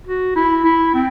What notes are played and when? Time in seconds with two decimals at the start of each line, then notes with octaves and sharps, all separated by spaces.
0.07 F#4
0.36 E4
0.64 E4
0.94 C4